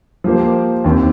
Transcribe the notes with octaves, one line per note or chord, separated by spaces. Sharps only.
F3 A#3 G4 C5
D#2 D#3 C4